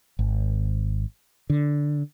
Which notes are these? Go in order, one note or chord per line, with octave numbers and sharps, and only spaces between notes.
G#1
D3